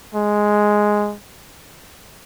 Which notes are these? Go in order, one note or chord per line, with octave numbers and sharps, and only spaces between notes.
G#3